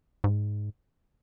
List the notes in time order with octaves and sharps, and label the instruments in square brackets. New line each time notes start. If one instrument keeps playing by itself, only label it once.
[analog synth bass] G#2